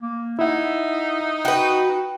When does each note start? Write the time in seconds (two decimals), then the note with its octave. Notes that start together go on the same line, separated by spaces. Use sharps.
0.02 A#3
0.39 D#4 E4 E5 F#5
1.45 F#4 B4 G5